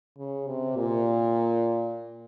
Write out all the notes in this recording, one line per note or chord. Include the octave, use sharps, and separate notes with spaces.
C#3
C3
A#2